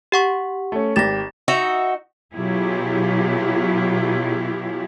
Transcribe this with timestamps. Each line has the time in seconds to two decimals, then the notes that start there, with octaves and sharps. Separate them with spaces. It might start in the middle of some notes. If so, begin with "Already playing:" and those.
0.12 G4 F#5 C#6
0.72 A3 C#4
0.96 G#1 G4 A6 A#6 E7
1.48 D#4 F#4 E5
2.34 B2 F#3 E4 F4 G4 G#4